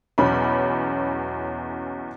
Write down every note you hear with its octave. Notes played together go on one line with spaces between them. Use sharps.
B1 E2 C#4 B5